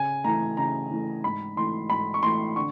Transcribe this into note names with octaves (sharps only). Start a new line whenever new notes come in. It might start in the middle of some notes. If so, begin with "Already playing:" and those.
Already playing: C#3 G#5
E3 A3 A#5
C#3 A#5
E3 A3
G#2 B5
E3 A3 C6
G#2 B5
C#6
E3 A3 C6
D3 C#6